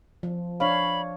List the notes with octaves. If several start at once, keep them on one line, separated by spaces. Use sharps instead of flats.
F3
D4 C#5 F5 B5